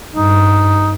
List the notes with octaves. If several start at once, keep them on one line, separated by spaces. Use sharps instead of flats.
G2 D#4